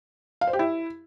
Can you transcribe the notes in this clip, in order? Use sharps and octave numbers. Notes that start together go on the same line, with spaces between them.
F5
C5
G4
E4